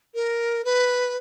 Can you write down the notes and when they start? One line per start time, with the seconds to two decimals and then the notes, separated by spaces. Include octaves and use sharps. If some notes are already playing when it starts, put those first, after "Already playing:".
0.14 A#4
0.64 B4